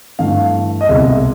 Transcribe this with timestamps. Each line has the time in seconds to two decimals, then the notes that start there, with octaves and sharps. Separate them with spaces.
0.19 G2 E3 A3 F5
0.81 D#5
0.89 C2 B2 G#3 E5